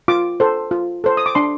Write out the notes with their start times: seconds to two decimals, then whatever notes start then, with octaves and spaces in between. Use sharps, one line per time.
0.08 F4 D6
0.40 A4 C5
0.71 F4
1.04 A4 C5
1.17 D#6
1.26 D6
1.35 D4 C6